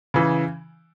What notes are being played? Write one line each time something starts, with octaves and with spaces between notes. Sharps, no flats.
C#3 E3